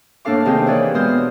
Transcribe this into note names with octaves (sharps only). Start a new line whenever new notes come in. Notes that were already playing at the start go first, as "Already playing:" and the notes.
A2 A#3 D4 A4 F5 D6
C3 D#3 C4 D#4 G4 G#4
E3 C4 B4 C#5 D5
B2 G#3 B3 C5 D#6 F6